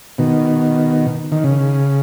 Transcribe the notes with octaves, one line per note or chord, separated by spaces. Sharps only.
B2 D#3
D#3
C#3